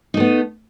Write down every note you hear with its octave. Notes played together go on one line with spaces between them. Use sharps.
A3 B3 D#4